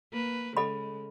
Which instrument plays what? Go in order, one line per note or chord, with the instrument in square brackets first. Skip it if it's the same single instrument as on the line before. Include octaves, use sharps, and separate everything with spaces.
[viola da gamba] A#3 B4
[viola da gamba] C#3 G#3 [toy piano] A4 D#5 B5